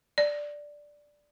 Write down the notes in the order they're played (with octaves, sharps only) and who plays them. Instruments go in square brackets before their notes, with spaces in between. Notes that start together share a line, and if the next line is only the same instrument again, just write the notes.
[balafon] D5